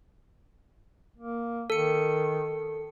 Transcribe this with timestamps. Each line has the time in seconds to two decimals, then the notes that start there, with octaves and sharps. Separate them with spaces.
1.18 A#3
1.70 D#3 A4 C#7